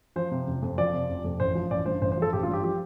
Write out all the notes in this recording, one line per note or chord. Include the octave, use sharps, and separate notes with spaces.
F3 C5
C3
F1
F2
F3 D5
C3
F1
F2
A1 C5
F3
A1 D5
G2 C5
A1 C5
C5
F3 A4
A1 G4
F4
G2
G4
F3 G4